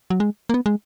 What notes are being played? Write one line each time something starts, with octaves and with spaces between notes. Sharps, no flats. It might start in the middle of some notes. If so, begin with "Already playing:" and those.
F#3
G#3
A#3
B3
G#3